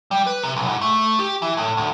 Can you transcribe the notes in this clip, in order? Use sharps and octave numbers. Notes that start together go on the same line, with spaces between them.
G3
B4
C3
B1
G#2
A3
G4
E3
A2
D2